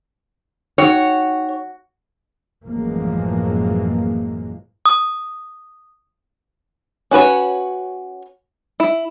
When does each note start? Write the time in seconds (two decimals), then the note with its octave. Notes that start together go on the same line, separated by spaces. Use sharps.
0.78 D#4 F#4 C#5 G5
2.65 A1 F#2 E3 F3 G#3 A#3
4.86 D#6
7.11 C#4 F#4 B4 C#5
8.80 E4